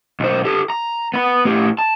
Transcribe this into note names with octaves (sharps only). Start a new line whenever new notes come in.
B1 C5
G4 A4
A#5
B3 B5
A2 G4
A5